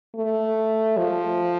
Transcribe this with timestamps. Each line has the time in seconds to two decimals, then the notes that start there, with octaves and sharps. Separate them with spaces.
0.15 A3
0.98 F3